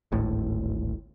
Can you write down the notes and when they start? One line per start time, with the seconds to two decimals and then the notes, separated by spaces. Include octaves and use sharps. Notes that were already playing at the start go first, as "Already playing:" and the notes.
0.12 D1 G#1 A2